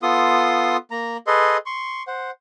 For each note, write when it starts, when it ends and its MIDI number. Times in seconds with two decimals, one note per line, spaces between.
0.02 0.77 59
0.02 0.77 65
0.02 0.77 69
0.02 0.77 84
0.02 0.77 87
0.91 1.17 58
0.91 1.17 82
1.27 1.57 68
1.27 1.57 69
1.27 1.57 71
1.27 1.57 75
1.27 1.57 84
1.66 2.03 84
1.66 2.03 85
2.07 2.31 72
2.07 2.31 78